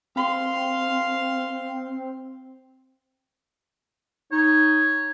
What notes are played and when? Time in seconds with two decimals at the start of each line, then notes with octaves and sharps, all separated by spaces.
0.16 C4 F5 C6
4.32 D#4 C#5